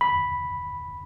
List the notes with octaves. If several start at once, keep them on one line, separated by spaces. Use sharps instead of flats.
B5